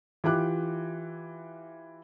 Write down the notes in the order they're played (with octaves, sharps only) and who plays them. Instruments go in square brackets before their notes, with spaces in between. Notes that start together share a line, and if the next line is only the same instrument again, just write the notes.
[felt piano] E3 F4 G4 D6 F#6